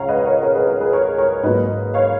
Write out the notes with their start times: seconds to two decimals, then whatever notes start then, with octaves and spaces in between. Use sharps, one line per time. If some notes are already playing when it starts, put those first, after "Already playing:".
Already playing: C#2 C#3 G#3 C#5 F5 F#5 A#5
0.08 B4 D#5
0.26 A#4 C#5
0.42 A#4 C#5
0.55 G#4 B4
0.67 A#4
0.80 G#4 B4
0.93 A#4 C#5
1.18 A#4 C#5
1.43 G#2 F#3 A#3 B4 D#5
1.94 C#5 F5